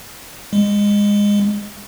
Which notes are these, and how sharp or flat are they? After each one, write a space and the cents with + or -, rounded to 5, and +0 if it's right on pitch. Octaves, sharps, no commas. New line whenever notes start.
G#3 -20